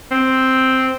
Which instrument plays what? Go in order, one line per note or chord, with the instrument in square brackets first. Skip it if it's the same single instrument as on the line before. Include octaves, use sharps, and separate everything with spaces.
[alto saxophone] C4